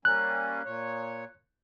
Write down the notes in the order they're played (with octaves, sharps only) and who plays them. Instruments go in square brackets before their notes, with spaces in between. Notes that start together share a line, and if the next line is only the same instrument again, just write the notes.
[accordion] G3 A#3 C#4 [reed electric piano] F#6
[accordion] A#2 C#5